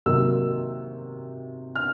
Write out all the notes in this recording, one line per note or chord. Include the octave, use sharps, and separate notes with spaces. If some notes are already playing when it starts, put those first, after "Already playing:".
C3 D#3 F#3 A#3 D#4 E6
F6